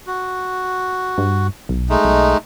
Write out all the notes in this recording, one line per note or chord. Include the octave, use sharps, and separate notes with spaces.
F#4
G2
B1
G#3 A3 D#4
B1